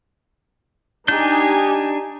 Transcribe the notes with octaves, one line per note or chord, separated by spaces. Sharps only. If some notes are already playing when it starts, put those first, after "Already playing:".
D4 D#4 G4 G#5 G6